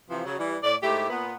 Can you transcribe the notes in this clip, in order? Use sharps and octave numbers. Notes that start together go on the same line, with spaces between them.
C3 E3 F3
C#3 F#3
E3 G3
A2 D5
G#2 A3 E4 G4
A#2 B3